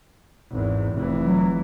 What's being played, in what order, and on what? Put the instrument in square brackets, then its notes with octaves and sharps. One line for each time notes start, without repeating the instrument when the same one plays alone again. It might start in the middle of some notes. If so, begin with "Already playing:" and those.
[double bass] G#1 E2
F1 E3
[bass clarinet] F#3